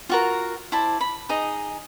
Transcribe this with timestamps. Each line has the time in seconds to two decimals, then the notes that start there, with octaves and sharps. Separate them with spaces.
0.09 F4 F#4 A#4
0.72 E4 C5 D5 A5
1.01 B5
1.29 D#4 G#4 D#5